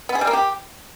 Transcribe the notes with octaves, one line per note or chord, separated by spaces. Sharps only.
B3
G#4
G3
A#3
G4